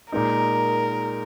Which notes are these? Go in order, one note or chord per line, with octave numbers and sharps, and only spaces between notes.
A#2 G#3 D#4 A#4